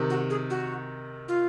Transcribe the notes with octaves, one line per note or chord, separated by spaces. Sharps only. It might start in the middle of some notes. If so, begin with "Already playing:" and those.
Already playing: C3 D#3
F#4
G#4
F#4
F4